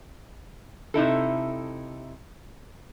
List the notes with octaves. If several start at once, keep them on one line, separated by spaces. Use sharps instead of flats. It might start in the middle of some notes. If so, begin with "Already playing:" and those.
C3 D#4 E4 A4